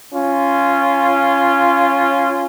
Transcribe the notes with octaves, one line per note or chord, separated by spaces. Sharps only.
C#4 F4